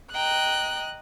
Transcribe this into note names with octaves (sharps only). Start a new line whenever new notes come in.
D#5 G5 A#5 F#6